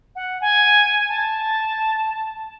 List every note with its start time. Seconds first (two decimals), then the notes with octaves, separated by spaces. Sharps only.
0.16 F#5
0.41 G#5
1.09 A5